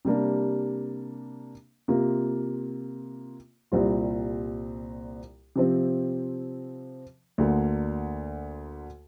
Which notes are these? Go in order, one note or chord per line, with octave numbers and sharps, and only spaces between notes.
C3 G3 A#3 D4
C3 A#3 F4
C2 A#2 G3 C4 F4
C3 F3 C4
D2 D3 A#3